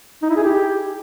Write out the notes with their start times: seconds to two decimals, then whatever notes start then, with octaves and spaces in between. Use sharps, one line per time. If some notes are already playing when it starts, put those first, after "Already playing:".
0.23 D#4
0.30 E4
0.36 G#4
0.43 G4